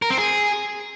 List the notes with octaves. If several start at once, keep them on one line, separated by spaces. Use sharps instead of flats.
A#4
C4
G#4